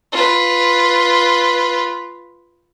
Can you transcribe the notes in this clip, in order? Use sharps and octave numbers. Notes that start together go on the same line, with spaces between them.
F4 B4